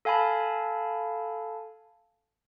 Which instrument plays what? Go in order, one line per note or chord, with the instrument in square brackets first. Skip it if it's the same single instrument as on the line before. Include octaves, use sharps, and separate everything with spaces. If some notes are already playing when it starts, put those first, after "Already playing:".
[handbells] A4 F5 G#5 A5 B5